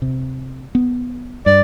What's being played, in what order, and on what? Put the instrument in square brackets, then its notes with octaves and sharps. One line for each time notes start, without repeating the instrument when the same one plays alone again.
[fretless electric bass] C3
B3
[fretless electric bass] G2 [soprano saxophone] D5